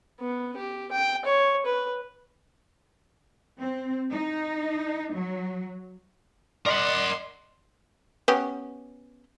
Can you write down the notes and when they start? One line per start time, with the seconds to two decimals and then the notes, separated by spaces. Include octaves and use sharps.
0.20 B3
0.56 G4
0.92 G5
1.25 C#5
1.65 B4
3.60 C4
4.11 D#4
5.13 F#3
6.66 A#4 D5 D#5 F#5 C6 B6
8.28 B3 C#4 G4